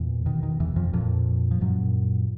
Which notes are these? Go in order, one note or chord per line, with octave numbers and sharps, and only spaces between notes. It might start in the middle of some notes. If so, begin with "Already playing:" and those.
Already playing: E2 A#2 E3
B2 D#3
D#3
E2 E3
F2 F3
F2 A#2 F3
F3
F#2 A#2 F#3